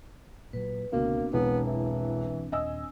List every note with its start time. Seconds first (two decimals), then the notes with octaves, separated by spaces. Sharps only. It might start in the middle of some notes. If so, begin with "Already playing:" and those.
0.53 A#2 F#3 B4
0.93 C#2 B2 D3 A3 A#3 C4 D4
1.33 E1 B1 B3
1.66 E3
2.52 D#1 D#5 G#5 E6